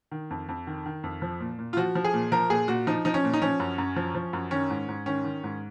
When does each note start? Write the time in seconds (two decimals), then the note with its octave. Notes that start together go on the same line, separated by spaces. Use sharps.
0.11 D#3
0.30 F2
0.49 F2
0.67 D#3
0.86 D#3
1.03 F2
1.22 F3
1.40 A#2
1.59 A#2
1.73 F4
1.77 F3 F#4
1.95 F3
2.04 G#4
2.14 A#2
2.32 F3 A#4
2.50 A#2 G#4
2.68 A#2 F#4
2.87 F3 D#4
3.05 F3 D#4
3.14 C#4
3.24 A#2
3.33 D#4
3.42 F3 C#4
3.60 F#2
3.78 F#2
3.96 F3
4.15 F3
4.33 F#2
4.51 D#3 C#4
4.70 G#2
4.88 G#2
5.06 D#3 C#4
5.24 D#3
5.44 G#2